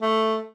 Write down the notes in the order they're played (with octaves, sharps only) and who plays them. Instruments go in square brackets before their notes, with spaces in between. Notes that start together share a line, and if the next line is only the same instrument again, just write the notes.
[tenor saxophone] A3